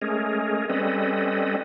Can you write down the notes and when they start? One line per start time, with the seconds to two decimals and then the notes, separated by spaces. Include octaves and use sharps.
0.02 G#3 A3 C#4 G#4 A#4
0.69 G3 C4 C#4 A4 B4 D#5